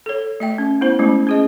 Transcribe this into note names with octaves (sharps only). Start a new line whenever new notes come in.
A4 C#5
A3 E5 G5
C#4
B3 E4 C5
G#3 A3 C#4 E4
C#4 G#4 D#5